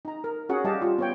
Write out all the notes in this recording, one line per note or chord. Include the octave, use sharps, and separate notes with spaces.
D#4 A#5
A#4
C#4 F#4 G#4 F#5
G3 G4 D#5 F5 A5
F4 G4
B3 C#5 G5